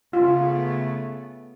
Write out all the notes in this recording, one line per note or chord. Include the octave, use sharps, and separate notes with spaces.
C#3 A3 B3 F4